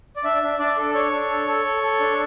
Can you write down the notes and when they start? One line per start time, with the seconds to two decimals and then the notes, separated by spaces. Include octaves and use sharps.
0.16 D5
0.24 D4 E5
0.42 D4
0.59 D4 D5
0.77 A4
0.94 D4 C#5
1.12 D4
1.30 A4
1.47 A4
1.65 A4
1.83 A4
2.00 D4